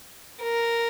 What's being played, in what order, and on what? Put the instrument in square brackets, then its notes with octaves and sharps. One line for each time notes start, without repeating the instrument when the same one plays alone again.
[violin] A#4